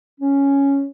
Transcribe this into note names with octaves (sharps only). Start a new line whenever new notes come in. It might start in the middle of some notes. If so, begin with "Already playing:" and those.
C#4